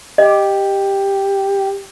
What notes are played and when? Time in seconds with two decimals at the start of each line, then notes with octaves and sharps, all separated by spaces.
0.18 G4 D#5